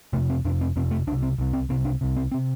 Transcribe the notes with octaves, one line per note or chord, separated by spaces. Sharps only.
F2 C3 A3
C4
F2 C3 D4
C4
F2 C3 C4
A3
C2 D4
C3
C4
C2 C3
C4
C2 C3 C4
D4
C2 C3
C4
C4
C3